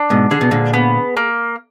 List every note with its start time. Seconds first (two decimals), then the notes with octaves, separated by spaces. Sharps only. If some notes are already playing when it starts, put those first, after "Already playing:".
Already playing: D4
0.10 G#2 B2
0.31 D3 G#4
0.41 B2
0.51 A#2 D3
0.73 B3
1.17 A#3